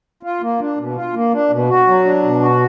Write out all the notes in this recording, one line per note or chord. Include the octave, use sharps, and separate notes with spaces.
F4
A#3
D4
B2
F4
A#3
D4
B2
F#4
F#3
D4
B2
F#4